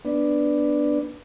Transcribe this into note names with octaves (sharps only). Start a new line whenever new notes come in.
B3 D4